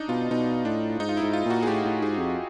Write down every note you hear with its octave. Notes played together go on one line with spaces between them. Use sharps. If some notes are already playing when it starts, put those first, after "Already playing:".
Already playing: D4 D#4
B2 F4
B2 D#4
A2 D4
G#2 D#4
F4
E4
G#2
F4
A#2
F#4
G#4
A2 G4
A2
G#2 G#4
F2